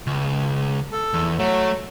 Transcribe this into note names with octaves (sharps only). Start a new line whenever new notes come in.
C#2
A4
E2
F#3 A3